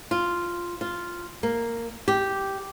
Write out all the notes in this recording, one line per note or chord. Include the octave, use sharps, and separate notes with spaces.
F4
F4
A#3
G4